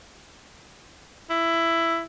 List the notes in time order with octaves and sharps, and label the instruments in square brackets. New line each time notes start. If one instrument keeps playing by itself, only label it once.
[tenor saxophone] E4